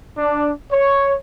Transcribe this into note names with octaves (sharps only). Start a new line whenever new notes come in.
D4
C#5